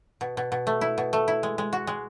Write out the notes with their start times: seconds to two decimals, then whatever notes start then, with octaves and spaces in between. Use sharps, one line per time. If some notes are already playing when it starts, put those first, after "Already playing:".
0.21 B2
0.37 B2
0.52 B2
0.67 A3
0.81 E4
0.98 B2
1.13 A3
1.28 E4
1.43 G#3
1.58 G#3
1.73 F#4
1.87 G#3